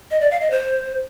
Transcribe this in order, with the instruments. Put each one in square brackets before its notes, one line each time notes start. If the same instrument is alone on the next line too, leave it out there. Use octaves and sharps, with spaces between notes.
[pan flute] D#5
D5
F5
D#5
C5